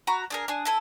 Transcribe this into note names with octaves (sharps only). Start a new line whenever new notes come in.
F#4 A#5 B5
D4 G#4 A#4
D4 G#4
E4 A4 G#5